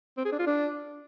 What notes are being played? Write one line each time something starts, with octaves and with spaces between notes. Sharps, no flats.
C4
G#4
D4
F4
D4